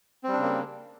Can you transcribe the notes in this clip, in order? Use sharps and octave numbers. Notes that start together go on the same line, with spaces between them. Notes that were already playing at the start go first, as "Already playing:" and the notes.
C#3 G3 A#3 C4 D4